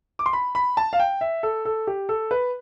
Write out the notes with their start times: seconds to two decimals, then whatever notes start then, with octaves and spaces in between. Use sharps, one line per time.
0.19 D6
0.26 C6
0.33 B5
0.55 B5
0.77 A5
0.93 F5
1.00 G5
1.21 E5
1.43 A4
1.65 A4
1.87 G4
2.09 A4
2.31 B4